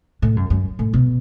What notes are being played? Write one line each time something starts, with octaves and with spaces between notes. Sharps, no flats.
A2
F#2
F#2
A2
B2